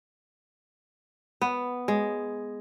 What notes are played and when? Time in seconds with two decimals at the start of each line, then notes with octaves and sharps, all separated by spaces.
1.41 B3
1.88 G#3